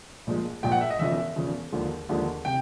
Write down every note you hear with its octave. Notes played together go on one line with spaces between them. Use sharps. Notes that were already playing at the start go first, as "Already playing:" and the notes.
A#1 A#2 F3 G#3
A#1 A#2 F3 G#3 G5
F#5
E5
D#5
E1 E2 C#3 F3 E5
E1 E2 C#3 F3
D#2 D3 F3 G#3
D#2 D3 F3 G#3
C3 G5